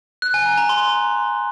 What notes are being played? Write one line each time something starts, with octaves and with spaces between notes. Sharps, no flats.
F#6
G#5
A#5
A#5
C6